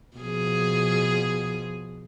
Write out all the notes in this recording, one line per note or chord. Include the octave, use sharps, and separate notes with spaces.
B2 F3 G#4